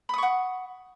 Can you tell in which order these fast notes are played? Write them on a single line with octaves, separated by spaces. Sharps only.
B5 D#6 C#6 F#5